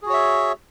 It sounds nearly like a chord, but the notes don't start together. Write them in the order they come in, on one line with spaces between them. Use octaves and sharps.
G#4 F#4 C#5 E5